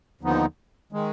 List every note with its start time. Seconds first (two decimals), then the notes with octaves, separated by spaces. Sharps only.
0.21 D#2 D3 F3 B3 D#4
0.92 D#3 G#3